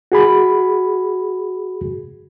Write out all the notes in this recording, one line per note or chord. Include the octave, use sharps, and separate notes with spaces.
F#4 G#4 B5